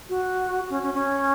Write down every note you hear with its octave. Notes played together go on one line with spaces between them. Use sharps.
F#4
C#4
C#4
C#4